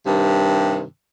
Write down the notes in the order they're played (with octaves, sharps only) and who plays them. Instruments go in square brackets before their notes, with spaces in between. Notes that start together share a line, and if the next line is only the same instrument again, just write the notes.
[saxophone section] G2 C3 D#3